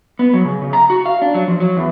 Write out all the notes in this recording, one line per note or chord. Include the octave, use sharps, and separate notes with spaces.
B3
F#3
C#3
C#3
A#5
F#4
F5
D4
F#3
F3
F#3
E2